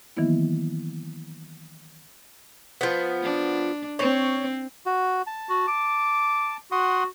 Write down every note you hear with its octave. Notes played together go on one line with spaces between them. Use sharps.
D#3 E3 F#3 A#3 B3 E4
F3 B3
D4
C4 C#5
F#4
A5
F#4
D6
F#4 F#5 C6 D#6